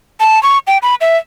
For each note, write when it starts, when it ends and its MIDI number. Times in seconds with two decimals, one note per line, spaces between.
0.20 0.41 81
0.43 0.58 85
0.67 0.78 79
0.82 0.95 83
1.01 1.17 76